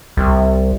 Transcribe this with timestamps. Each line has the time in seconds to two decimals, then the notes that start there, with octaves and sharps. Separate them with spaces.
0.17 C2